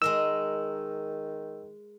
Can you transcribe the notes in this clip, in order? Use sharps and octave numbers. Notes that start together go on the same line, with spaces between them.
D#3 G#3 A#4 D#5 E6